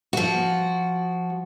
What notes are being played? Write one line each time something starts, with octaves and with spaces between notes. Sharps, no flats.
F3 F#4